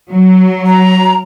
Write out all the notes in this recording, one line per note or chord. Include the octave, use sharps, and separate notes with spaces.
F#3
A#5